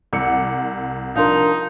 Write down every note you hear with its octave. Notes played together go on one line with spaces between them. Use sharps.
C2 F#5 D6 E6 C#7
F3 D4 D#4 A#4 F5 C6